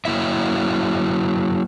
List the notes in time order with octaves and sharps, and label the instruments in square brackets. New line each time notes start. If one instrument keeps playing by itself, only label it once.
[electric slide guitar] F#3 A#3 E4 E5